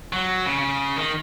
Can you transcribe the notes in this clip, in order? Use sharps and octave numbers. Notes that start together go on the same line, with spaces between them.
F#3
C#3
C#3
D#3